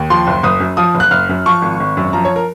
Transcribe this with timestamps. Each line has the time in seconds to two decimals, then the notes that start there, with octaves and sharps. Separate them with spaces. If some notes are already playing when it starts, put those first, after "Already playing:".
Already playing: D#2
0.10 F3 C6
0.27 F#1
0.43 F#1 D#6
0.60 F#2
0.77 F3 D#6
0.95 F#1
1.00 F#6
1.11 F#1 F6
1.29 F#2
1.46 F3 C#6
1.62 G#1
1.80 G#1
1.97 F#2
2.13 F3 A#5
2.25 C#5
2.36 A#4